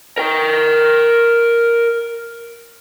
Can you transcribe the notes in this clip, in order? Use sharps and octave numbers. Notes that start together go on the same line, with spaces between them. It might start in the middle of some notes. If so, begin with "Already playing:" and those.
A#4 G5